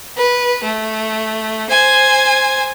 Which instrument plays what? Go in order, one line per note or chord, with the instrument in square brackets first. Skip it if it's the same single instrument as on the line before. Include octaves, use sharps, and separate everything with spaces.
[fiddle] B4
A3
C5 G#5